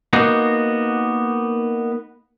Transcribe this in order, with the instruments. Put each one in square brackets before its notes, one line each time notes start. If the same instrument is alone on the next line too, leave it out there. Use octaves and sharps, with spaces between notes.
[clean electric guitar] A#3 B3 D#4 F#4